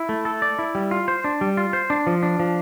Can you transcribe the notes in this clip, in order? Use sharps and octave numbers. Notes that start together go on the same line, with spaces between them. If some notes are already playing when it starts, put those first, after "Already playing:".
Already playing: E4
A3
A4
D5
E4
G3
F4
C5
D4
G3
F4
C5
D4
F3
D4
F3